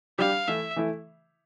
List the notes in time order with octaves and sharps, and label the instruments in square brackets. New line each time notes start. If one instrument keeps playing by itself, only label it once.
[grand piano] G3 D4 G4 [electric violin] F5
[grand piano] E3 A3 E4 [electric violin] E5
[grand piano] E3 A3 E4